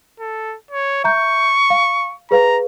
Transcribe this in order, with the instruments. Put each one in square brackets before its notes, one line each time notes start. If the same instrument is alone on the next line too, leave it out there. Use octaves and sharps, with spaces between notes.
[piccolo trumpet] A4
C#5
[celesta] E5 A#5 G6 [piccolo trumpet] C#6
[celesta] F5
[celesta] G#4 B4 F5 [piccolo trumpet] A#5